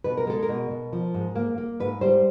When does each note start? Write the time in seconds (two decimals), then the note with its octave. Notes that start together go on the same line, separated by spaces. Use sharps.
0.04 B2 B4
0.17 A#4
0.27 G#3 A4
0.43 A#4
0.49 B2
0.71 B2
0.93 F3
1.14 G#2
1.36 A#3
1.58 A#3
1.80 G#2 B4
2.01 G3 C5